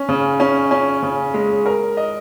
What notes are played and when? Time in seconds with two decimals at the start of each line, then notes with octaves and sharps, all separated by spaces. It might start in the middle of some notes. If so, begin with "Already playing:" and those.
Already playing: C#4
0.09 C#3
0.40 C#4
0.71 C#4
1.03 C#3
1.34 G#3
1.66 A#4
1.97 D#5